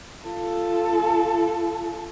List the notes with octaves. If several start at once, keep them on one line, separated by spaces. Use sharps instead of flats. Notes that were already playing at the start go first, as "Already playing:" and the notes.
F4 A4